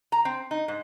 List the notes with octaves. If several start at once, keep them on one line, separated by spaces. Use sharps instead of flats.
A#5
C4
D#4
G#2